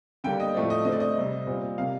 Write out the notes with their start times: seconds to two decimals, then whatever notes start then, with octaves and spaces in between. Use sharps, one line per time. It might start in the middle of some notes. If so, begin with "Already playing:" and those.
0.24 D3 G3 A#3 G5
0.40 D#5
0.54 A2 F3 A3 C4 D5
0.70 D#5
0.85 D3 A3 C4 D#5
0.92 D5
1.00 D#5
1.16 C3 G3 C4
1.47 A#2 G3 C4
1.78 C3 G3 A#3 F5